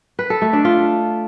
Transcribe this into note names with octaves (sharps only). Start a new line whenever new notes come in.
B4
A4
A3
D4
F4